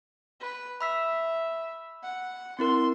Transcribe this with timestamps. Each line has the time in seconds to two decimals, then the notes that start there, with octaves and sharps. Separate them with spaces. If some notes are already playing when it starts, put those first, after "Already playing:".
0.40 B4
0.81 E5 B5 E6 B6
2.03 F#5
2.59 C4 E4 A#4 C6